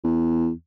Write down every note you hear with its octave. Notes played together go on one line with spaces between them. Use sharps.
E2